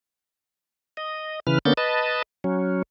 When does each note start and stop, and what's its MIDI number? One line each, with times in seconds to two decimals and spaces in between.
0.97 1.40 75
1.47 1.59 49
1.47 1.59 52
1.47 1.59 71
1.47 1.59 89
1.65 1.73 50
1.65 1.73 58
1.65 1.73 59
1.65 1.73 61
1.65 1.73 91
1.65 1.73 93
1.77 2.22 71
1.77 2.22 75
1.77 2.22 81
2.44 2.82 54
2.44 2.82 61